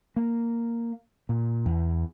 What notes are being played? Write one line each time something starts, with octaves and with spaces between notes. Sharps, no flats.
A#3
A#2
E2